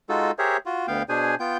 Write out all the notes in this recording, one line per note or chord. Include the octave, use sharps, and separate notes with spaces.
G#3 D#4 F4 F#4 A4
G4 G#4 A#4 C5 C#5 E5
F4 F#4
D2 B3 F5 G5
B2 D4 G#4 C5 G#5
B3 F4 G5 G6